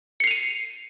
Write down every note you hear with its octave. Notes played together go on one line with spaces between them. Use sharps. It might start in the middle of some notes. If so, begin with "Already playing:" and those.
C7 C#7 D#7 F7